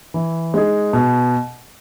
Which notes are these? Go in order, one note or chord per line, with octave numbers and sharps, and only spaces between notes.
E3
G#3 D#4 G#4
B2